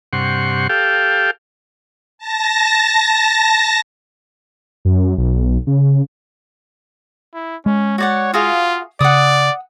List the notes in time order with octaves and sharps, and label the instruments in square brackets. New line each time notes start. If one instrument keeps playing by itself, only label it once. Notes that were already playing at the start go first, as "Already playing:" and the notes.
[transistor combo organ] G2 C3 F#5 C6 C#6
G4 A4 F5 G5
[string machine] A5 A#6
[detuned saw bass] F#2
B1
C#3
[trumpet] E4
[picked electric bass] G#3 [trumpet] C#4
[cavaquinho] F#4 D5 F#5 [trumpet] C#5
[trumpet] F4 [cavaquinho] F#4 G#4 F5
[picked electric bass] C#3 [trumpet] D5 [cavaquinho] F#5 D#6